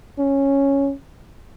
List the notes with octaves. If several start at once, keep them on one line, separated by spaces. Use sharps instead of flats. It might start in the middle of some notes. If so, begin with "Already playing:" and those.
C#4